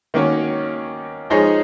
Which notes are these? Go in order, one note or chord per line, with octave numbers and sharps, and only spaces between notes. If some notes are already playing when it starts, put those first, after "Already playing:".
D#3 A#3 C#4 F#4 C#5
F3 G#3 D#4 G#4 C#5